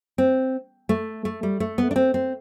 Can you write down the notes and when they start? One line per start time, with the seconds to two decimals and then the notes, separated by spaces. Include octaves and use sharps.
0.18 C4
0.89 A3
1.25 A3
1.43 G3
1.60 A3
1.78 B3
1.91 D4
1.96 C4
2.14 C4